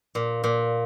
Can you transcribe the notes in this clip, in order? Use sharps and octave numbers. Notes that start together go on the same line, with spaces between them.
A#2
A#2